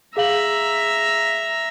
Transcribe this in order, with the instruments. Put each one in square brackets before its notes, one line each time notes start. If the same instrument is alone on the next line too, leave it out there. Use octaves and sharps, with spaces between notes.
[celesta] G#4 F5 F#7 [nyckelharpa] E5 A#5